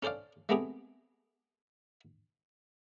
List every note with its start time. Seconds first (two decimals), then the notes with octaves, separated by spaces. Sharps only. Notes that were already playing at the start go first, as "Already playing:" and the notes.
0.03 C#4 A4 C5 D5 F5
0.49 G#3 A3 B3 C4 G4 G#4